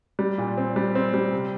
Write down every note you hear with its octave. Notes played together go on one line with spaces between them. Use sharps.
G3
A#2
C4
G3
C4
G3
C3